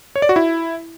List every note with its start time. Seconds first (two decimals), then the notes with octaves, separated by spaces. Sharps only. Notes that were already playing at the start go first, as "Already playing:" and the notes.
0.16 C#5
0.22 D5
0.29 F#4
0.36 E4